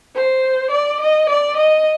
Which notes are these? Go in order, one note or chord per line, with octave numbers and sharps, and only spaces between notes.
C5
D5
D#5
D5
D#5